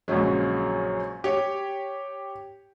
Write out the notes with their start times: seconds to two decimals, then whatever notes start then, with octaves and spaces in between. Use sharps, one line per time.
0.08 A#1 F#2 C#3 F#3 G#3
1.24 G4 C#5